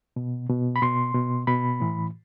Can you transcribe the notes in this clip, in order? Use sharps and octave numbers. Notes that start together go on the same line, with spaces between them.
B2
B2
B5
B2 C6
B2
B2 B5
A2 E3